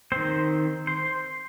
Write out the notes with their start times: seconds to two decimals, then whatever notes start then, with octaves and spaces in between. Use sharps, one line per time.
0.12 D#3 C4 C5
0.87 C5